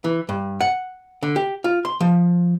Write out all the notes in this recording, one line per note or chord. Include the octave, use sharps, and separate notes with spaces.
E3
G2
F#5
D3
G4
F4
C6
F3